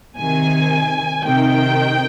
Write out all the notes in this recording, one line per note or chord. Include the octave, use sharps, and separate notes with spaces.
C3 D#3 G#5
C3 D#3 G5